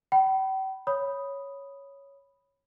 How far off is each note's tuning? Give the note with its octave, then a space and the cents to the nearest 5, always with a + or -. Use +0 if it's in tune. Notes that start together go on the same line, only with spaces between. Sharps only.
G5 -40 B5 +0
C#5 +0 B5 +0 D#6 +0